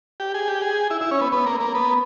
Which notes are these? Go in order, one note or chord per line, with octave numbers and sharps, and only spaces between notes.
G4
G#4
G4
G#4
E4
E4
C#4
B3
B3
A#3
A#3
B3